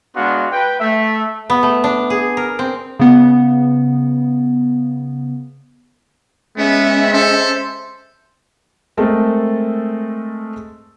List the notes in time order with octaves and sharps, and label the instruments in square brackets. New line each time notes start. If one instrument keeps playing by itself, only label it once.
[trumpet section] G#3 B3 D4 F#4 F5 C6
B4 G5
A3 E5
[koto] B3
A3
D4
G#4
A#4
C4
[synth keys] C#3 B3
[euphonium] G#3 [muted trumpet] B3 [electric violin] C#4 E5
[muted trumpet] A4 [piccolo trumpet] C5
[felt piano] G#3 A3 C4 A4 A#4